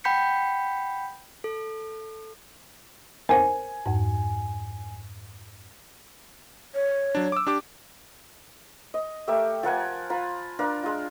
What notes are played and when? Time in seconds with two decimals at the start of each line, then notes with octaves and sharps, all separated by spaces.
0.04 F#5 G5 B5 G6 B6 C#7
1.44 A4
3.29 A#4 C5 G#5
3.86 F2 G#2
6.75 C#5
7.15 F#3 D4
7.32 D6 E6
7.47 D4 G4 D6
8.94 D#5
9.28 A3 G4 A#4 E5
9.63 F3 A#4 F#5 G#5
10.10 F4 A#5 B5
10.59 D4 A#4 F5
10.83 G#3 F4